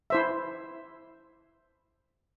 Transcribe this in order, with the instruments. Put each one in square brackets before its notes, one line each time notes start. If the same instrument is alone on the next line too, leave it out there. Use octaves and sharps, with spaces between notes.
[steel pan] E4 C5 E5